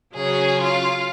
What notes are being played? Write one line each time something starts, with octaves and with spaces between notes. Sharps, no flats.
C#3 F#3 C#4 G#4
F4